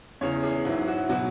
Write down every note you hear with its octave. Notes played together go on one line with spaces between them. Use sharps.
E2 C#3 E3 C#5
G#4
G#2 F#3 E4
F#4
B2 F#3 F#4